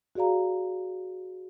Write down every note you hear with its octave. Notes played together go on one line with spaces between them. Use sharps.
F#4 G#4 D5 F5 A#5